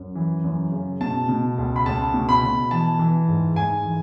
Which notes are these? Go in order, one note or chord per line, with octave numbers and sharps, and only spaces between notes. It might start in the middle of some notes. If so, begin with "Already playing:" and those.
Already playing: F#2
E3
F#2
C#3
B2 A5
B2
C#2
B5
C#2 A5
B2
B5
B2
E3 A5
E3
G#2
G#2 G#5
E3